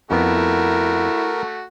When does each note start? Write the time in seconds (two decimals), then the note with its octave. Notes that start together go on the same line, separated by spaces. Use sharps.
0.11 F2 A3 B3 E4 F#4 A#4